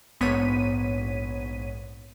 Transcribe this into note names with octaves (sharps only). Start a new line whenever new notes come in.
A#1 G#2 B3 C#5 B6 D#7